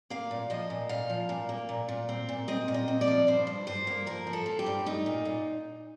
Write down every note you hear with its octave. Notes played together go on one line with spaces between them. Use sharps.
A#3 F5
A#2
F3 D#5
A#2
A#2 F5
F3
A#2
A#3
A#2
A#2
C4
A#2
C4 D#5
A#2
D#5
C4
D5
F3
G2 C5
G2
G2 C5
A#3
F3 A#4
F3
A4
F3
G4
G2
A3 D#4
A#2
A#2